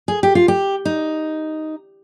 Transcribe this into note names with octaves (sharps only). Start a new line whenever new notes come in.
G#4
G4
F4
G4
D#4